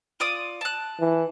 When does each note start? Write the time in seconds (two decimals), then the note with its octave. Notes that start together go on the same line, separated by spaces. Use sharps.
0.20 F4 D5 D#6
0.61 A5 F#6
1.00 E3